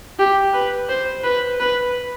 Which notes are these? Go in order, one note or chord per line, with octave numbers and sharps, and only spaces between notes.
G4
B4
C5
B4
B4